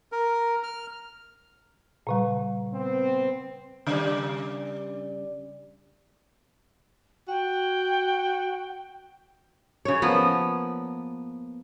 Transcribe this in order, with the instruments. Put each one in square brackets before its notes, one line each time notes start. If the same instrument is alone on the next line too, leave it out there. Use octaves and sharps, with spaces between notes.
[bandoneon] A#4
F6
[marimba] A#2 C#3 G3
[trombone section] B3 C4
[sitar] C#3 G3 D5
[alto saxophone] F#4 [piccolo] G5
[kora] C#3 C#5
F3 A#3 B3